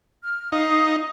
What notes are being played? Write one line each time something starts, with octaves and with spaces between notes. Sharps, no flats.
F6
D#4 F5 D#6